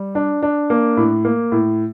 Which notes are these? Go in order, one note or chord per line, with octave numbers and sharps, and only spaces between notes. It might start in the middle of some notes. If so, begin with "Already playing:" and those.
Already playing: G3
D4
D4
A#3
A2
A#3
A2